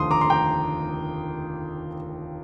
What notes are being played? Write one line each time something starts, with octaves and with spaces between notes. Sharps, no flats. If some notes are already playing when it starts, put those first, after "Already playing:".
Already playing: F1 D#2 D3 F3 A3 C6 D#6
A#5 D6
C6
G5 A#5